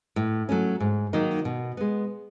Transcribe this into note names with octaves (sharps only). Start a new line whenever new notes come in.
A2
F#3 A3 C#4
G#2
D#3 F#3 A#3 D#4
B2
G#3 B3